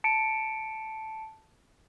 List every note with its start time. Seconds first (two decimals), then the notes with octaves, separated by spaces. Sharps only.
0.04 A5 C#7 D7